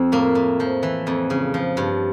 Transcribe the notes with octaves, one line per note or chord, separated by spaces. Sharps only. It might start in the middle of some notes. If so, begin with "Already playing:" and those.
Already playing: F2 C4
A2 A#3
A2
F3
E3
F2
C#3
F3
G2